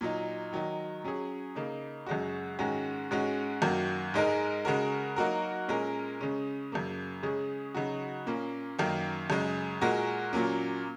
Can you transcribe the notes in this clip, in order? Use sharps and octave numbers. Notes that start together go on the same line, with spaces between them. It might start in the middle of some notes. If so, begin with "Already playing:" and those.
A#2 F#3 D#4
D#3 F#3 D#4
F#3 C#4 G#4
C#3 A#3 D#4
F#2 C#3 G#3 F#4
G#2 D#3 G#3 C#4 F#4
G#2 G#3 C#4 F#4
F#2 D#3 A#3 F#4
G#2 G#3 D#4 A#4
C#3 G#3 F#4 A#4
F#3 A#3 D#4 F#4 A#4
A#2 G#3 C#4 A#4
C#3 G#3 C#4
F#2 C#3 A#3
C#3 G#3 C#4 G#4
C#3 F#3 D#4 F#4
A#2 A#3 C#4
F#2 D#3 A#3
F#2 C#3 G#3
A#2 G#3 F#4 A#4
A#2 F#3 A#3 C#4